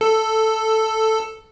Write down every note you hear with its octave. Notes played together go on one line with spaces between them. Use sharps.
A4